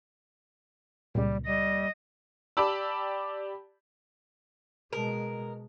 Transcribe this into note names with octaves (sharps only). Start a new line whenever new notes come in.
C#2 A#2 G3
G3 D#5
G4 D5 A5 B5 D6 E6
B2 G#3 A#4